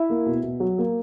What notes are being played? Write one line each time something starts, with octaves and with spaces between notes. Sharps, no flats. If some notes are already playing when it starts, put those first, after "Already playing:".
Already playing: E4 E5
A#3
B2
B2
F#3
A#3